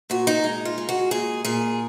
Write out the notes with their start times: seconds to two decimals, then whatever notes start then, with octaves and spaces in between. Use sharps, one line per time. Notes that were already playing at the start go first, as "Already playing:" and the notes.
0.10 A#2 F#4
0.27 D#4
0.44 G#3
0.65 F4
0.78 G#3
0.89 F#4
1.11 A#2 G#4
1.45 A#2 G#4